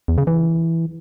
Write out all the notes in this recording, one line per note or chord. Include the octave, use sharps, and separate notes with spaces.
E2
C#3
E3